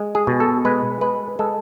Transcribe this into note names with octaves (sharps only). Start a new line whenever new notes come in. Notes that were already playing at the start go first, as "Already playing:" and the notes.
Already playing: G#3
G#4
B2
A4
G#3 B4
G#3 B4
G#3 A4